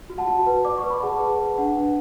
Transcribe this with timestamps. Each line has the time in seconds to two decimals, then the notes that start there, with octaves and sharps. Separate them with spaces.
0.10 F#4
0.18 F#5 A5
0.28 F#4
0.46 B4
0.65 D5 D6
0.78 C#6
0.84 B4
0.90 B5
1.02 G#4 F#5 A5
1.21 G#4
1.39 B4
1.58 D4 F#5
1.76 D4